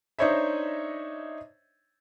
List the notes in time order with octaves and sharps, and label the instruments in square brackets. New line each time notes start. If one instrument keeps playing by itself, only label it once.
[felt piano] D4 D#4 C5 C#5 D#5 E5